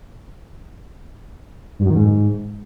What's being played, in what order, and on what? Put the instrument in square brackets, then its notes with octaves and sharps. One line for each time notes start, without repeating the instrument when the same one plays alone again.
[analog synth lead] G2
F#2
D#3
G#2